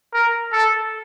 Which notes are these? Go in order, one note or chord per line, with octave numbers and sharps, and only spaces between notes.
A#4
A4